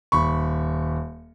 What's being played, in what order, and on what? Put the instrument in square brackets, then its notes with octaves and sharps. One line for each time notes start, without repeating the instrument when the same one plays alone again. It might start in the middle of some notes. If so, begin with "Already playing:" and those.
[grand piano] D#1 B5 C#6